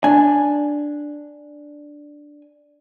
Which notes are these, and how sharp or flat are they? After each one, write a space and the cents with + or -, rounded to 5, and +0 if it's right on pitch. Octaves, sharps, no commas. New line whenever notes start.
D4 +0 G#5 +0